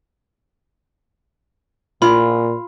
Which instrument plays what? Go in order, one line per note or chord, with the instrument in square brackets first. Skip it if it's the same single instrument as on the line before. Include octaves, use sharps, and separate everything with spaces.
[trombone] A#2 [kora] F4 [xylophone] B5